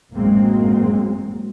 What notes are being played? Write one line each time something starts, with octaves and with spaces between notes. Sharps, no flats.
A1 F#2 F#3 G#3 A#3 C4